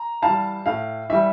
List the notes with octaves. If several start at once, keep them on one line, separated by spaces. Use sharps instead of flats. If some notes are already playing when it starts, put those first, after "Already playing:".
Already playing: A#5
E3 F5 A5
G3
A2 F5
E3 G3 E5